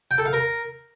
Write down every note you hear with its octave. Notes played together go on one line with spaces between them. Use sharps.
G5
A4
F5
A#4